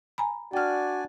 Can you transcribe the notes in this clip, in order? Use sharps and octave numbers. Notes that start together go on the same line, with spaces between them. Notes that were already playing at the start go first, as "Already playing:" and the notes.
G#5 A#5 B5
D4 F#4 D5 G5 G#5 F6